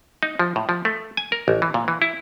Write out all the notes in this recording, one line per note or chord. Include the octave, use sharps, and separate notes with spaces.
D#4
F3
A2
F3
A3
G#5
A#4
A1
E3
A#2
E3
E4